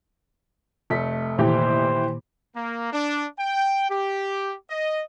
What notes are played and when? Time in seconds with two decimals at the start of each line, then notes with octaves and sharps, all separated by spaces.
0.90 F1 A3 B6
1.39 A#2 D#3 E3 G4 C5
2.56 A#3
2.93 D4
3.38 G5
3.90 G4
4.70 D#5